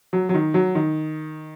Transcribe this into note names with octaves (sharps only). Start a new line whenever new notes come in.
F#3
F#3
D#3
F#3
D#3